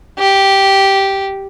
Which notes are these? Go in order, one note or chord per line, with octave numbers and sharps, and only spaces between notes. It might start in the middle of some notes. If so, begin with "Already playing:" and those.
G4